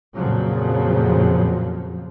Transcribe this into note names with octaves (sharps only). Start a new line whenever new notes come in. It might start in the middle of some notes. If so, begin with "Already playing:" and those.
F2 A#2 C#3 F3 F#3